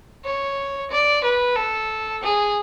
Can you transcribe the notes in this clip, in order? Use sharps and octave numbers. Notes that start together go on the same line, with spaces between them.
C#5
D5
B4
A4
G#4